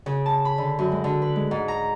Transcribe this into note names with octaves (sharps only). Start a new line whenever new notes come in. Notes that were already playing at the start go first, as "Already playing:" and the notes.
C#3
A5
B5
D3
F#2
G#3
D3
B4
G#3
G#2
A#5